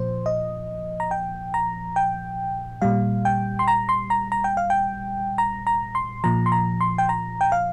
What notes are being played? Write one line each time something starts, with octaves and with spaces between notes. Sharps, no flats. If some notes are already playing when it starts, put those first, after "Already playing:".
Already playing: A#2 F3 C5
D#5
A#5
G5
A#5
G5
A#2 G3 F5
G5
C6
A#5
C6
A#5
A#5
G5
F5
G5
A#5
A#5
C6
A#2 F3 A#5
C6
A#5
C6
G5
A#5
G5
F5